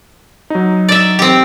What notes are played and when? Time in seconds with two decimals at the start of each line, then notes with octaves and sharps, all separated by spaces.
0.50 F#3 D#4
0.89 D5 E5
1.19 C4 G4